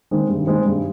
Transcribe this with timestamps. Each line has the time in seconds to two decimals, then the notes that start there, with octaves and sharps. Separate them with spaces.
0.11 D#3 G#3 C4
0.29 G2
0.47 D#3 G#3 C4
0.66 G2